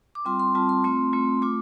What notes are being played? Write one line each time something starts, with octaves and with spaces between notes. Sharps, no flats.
D6
G3 C4 F4 C6
C6
G3 C4 F4 A5
C6
A3 C4 F4 C6
A3 C4 F4
A3 F4 D6